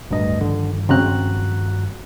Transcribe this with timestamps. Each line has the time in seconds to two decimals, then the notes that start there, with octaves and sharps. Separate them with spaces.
0.10 D1 D2 G2 D#5
0.41 G2 D3 D#3 F3
0.89 C#3 C4 F#4 A#5 F#6